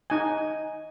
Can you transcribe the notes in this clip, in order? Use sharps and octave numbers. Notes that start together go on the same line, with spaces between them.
D#4 G#5